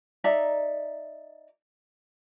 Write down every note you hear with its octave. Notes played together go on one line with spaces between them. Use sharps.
D#4 D5 E5 A#5